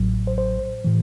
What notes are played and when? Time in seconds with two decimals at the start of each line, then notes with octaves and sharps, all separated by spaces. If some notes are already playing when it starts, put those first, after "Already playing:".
Already playing: A1 A2 F#3
0.27 C5
0.38 C5
0.84 A2 E3